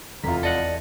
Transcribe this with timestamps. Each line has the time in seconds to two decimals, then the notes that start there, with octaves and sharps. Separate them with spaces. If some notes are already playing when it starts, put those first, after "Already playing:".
0.24 F1 E2 F4 A#5 B6
0.43 A4 D5 D#5 F#5